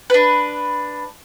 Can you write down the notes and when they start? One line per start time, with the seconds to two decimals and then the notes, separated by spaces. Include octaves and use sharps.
0.10 D4 B4